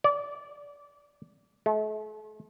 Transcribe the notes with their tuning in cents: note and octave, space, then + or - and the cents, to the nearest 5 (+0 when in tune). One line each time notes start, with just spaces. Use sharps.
D5 -25
A3 -40